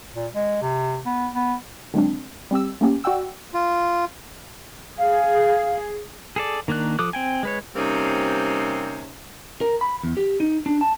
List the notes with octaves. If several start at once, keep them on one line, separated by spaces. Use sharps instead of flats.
A#2
G#3
C3
B3
B3
D3 D#3 F#3 G#3 C4 D4
G3 C4 G4 E6
A3 A#3 C#4 G4
F#4 D5 F#5 G5 E6
F4
G#4 F5
G#4 A4 D5
D#3 A#3 D4 F#6
F3 A4 D6 D#6 F#6
C4 G5 G#5
G#3 B4 C#5
C3 G3 A#3 C4 C#4 D#4
A#4
B5
E2
G4
D#4
D4
A5